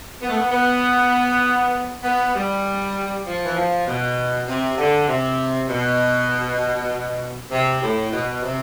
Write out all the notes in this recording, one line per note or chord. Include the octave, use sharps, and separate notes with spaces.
B3
A3
B3
B3
B3
G3
F3
E3
F3
B2
C3
D3
C3
B2
C3
A2
B2
C3